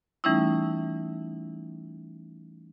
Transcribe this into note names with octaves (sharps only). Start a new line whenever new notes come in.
E3 G3 A3 C#4 D#4 E4